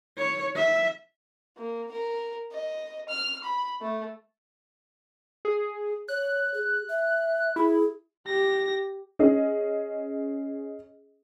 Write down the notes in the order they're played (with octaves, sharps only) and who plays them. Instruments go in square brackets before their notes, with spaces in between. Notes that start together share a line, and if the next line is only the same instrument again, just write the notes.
[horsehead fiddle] C#5
E5
[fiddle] A#3
A#4
D#5
F6
B5
A3
[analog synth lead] G#4
[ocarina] C#5 [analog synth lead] F#6
[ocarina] G#4
E5
[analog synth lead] E4 [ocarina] G#4
[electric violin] G4 A#6
[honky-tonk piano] C#4 G#4 D#5